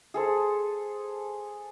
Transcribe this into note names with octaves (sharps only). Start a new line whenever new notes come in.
G#4 A4 C5